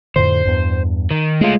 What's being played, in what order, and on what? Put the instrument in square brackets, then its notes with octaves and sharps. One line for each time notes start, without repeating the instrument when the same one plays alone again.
[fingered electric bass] F2 A2 D3 [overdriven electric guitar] C5
[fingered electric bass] E2 G2
[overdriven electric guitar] D#3
[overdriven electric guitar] G#3 F4 [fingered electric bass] A3